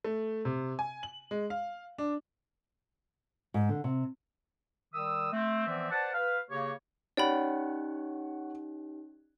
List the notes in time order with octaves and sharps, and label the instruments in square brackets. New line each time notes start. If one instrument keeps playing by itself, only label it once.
[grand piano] A3
C3
G#5
F#7
G#3
F5
D4
[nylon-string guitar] G#2
D3
C3
[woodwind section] D#3 G3 D#6 E6
A3 C4
E3 F3 B3 C4 D5 E5
B4 C5 D5 F#5 A5
B4 F5
C#3 A#3 G4 C#5
[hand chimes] C#4 D#4 G4 [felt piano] C#5 F#5 [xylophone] D5 G5 B5